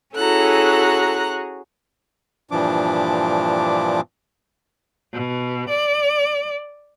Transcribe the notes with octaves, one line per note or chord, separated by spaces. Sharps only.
C#4 E4 F#4 G#4 A4 A#5 F#6
G2 A#2 E3 F3 D4 D6
B2
D5